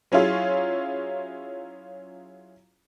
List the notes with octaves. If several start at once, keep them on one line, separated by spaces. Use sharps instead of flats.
F#3 C#4 E4 F4 G#4